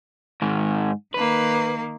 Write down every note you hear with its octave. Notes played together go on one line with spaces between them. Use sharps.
G#2 D#3
D#3 A#3 B4